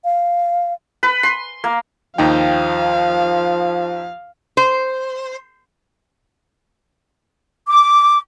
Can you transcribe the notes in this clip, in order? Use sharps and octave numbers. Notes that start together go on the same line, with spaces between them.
F5
B4
C6
A#3
D#2 F3 D#4 F5 G5
C5
D6